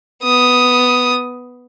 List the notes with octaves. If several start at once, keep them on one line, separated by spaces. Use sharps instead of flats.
B3 D#6